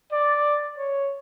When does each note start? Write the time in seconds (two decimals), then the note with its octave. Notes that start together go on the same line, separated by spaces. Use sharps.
0.12 D5
0.78 C#5